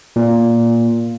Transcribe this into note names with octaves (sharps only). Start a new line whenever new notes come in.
A#2